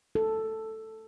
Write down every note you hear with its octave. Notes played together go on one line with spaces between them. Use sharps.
A4